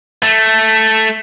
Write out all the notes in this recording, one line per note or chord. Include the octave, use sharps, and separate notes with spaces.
A3